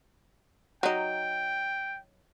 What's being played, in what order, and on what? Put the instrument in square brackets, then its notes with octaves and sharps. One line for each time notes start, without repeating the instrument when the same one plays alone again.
[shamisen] F#3 D#4 [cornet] G5